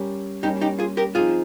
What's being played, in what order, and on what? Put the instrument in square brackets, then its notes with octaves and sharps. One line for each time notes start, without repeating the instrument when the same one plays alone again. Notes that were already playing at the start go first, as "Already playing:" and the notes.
Already playing: [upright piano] G3 C#4 G4 A#4
[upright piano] G3 A#3 C#4 [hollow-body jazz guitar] D#4 G4
[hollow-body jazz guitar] D#4 G4
F4 G#4
G4 A#4
[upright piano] F3 C4 D#4 [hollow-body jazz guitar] F4 G#4